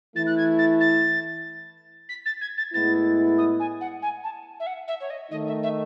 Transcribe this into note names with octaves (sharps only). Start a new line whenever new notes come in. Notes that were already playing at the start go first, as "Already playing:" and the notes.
E3 A3 E4 A6
F#6
G#6
A6
A6
B6
A6
G#6
A6
A2 G#3 B3 E4 A6
D#6
G#5
F#5
G#5
A5
E5
F#5
E5
C#5
D#5
D#3 A3 D#4 D#5
E5
E5